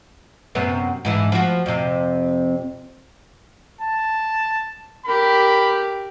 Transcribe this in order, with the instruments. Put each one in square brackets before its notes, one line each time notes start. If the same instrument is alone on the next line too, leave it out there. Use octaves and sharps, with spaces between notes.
[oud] F#2 C3 B3
G#2 E3 D4
F3 F#4
F2 C3
[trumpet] A5
[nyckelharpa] G4 A#4 [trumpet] B5